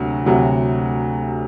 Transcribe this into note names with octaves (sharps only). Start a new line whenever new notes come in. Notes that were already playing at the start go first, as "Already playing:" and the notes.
Already playing: D2 C3 F#3
D2 C3 F#3